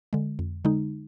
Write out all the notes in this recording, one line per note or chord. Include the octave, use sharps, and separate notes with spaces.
D3 G#3
F2
D3 G#3 D#4